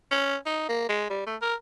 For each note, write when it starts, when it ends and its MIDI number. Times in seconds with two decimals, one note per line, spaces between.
0.11 0.36 61
0.46 0.68 63
0.69 0.88 58
0.89 1.07 56
1.10 1.22 55
1.27 1.36 57
1.42 1.55 70